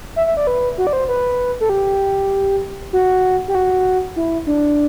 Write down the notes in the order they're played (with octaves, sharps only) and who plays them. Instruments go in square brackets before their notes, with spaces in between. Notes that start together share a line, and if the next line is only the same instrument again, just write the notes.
[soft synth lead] E5
E5
D5
B4
F#4
D5
C5
B4
A4
G4
F#4
G4
F#4
E4
D4